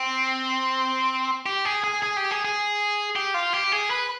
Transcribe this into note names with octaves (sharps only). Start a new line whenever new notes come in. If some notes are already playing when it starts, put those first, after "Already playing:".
Already playing: C4
G4
G#4
G#4
G#4
G4
G#4
G#4
G4
F4
G4
G#4
B4